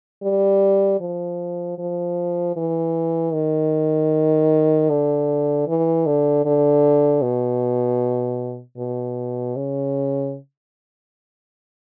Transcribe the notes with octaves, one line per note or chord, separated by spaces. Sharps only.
G3
F3
F3
E3
D#3
D3
E3
D3
D3
B2
B2
C#3